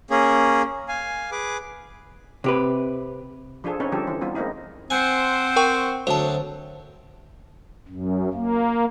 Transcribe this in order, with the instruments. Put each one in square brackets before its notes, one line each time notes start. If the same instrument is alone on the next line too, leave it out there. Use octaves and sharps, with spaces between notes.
[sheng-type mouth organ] A#3 C#4 G#4
F5 G#5
G#4 B4 D6
[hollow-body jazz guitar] C3 G4 B4
[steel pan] F3 D4 F4 G#4 A4
C4 C#4 D#4 B4 C#5
D3 F3 G3 G4 A4
E3
G3 B3 C4 D#4 F4
G#3 A#3 C4 D#4 E4
[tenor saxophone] C4 [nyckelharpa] C5 F#5 [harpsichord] G#5
[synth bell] A#4 G5 C#6
[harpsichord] D2 F#3 [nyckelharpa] A4 [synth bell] C5 A5
[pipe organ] F#2
A#3